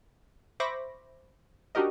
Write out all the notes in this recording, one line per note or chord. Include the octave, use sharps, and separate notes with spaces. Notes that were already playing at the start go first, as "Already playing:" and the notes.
C5 E5 B5 C#6 D6 A#6
D4 D#4 F#4 G4 A#4 D#5